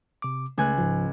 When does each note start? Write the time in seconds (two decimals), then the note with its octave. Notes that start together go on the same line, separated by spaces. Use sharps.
0.22 C3 D6
0.58 C#2 A3 G#5 F#6
0.78 G#2 F3